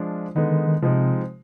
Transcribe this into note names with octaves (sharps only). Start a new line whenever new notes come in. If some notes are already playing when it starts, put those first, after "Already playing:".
Already playing: F3 G#3 D4 F4
D3 D#3 G#3 B3 D#4
D#3
D#3
C3 F3 G#3 C4 D#4